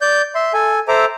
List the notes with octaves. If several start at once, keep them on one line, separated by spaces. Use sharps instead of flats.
D5 G6
E5 C6
A4 G#5
A4 C5 E5 A#5 D6